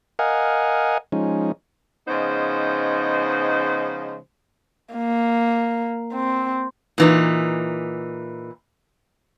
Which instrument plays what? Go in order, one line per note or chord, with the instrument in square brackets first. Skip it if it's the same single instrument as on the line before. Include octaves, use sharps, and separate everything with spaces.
[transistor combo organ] A#4 D#5 F5 F#5 G#5
F3 G#3 C#4 D#4
[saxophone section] C#3 F3 G#3 B3 D#4 C5
[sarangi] A#3
C4
[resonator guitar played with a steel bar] A#2 E3 D#4